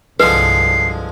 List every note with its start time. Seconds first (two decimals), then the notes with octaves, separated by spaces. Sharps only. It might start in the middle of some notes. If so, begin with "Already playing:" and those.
0.20 C2 G2 D3 F3 G#3 B4 C7